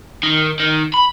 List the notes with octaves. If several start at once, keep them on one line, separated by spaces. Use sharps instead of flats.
D#3
D#3
B5